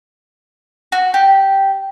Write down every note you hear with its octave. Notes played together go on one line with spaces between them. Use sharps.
F#4
G4